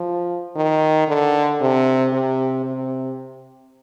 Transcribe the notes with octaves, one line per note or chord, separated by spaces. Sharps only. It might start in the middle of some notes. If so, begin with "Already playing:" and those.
Already playing: F3
D#3
D3
C3
C3
C3